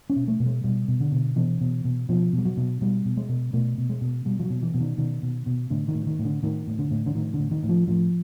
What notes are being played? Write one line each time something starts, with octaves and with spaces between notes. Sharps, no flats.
C#4
B2
A3
B2
G#3
B2 G3
B2
D3
B2
B2 E3
B2
B2
B2 F3
B2 G3
F#3
B2
B2 G3
B2
G#3
B2
B2 A3
B2
G#3
B2
B2 G3
F3
F#3
B2
E3
B2
D#3
B2 D#3
B2
B2
A2 D3
D#3
A2
D#3
A2
D3
A2 D#3
A2
D3
A2
D3
A2 D#3
D3
A2
D#3
A2
F3
A2 F3